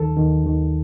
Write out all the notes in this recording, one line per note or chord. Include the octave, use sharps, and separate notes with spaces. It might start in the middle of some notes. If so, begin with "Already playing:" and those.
Already playing: D#2 D#3 A4
D#2 D#3
D#2 D#3